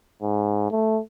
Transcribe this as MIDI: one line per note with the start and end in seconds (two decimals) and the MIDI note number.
0.21 0.69 44
0.71 0.99 57